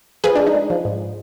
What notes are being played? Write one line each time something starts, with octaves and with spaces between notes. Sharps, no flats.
F3 G#4 B4
D4
G#3
D#4
G#3
F3
G#2